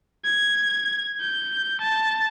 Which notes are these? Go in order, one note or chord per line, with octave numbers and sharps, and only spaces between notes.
G#6
G6
A5